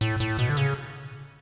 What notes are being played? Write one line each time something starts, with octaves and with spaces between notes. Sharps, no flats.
A2
A2
B2
D3
C#3